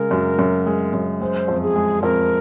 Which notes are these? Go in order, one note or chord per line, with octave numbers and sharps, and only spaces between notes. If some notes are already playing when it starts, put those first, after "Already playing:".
Already playing: C#3 G#3 A#4
F#2
F#2
G#3
F#2
G#3 C5
F2
G#4
G#3
F2 A#4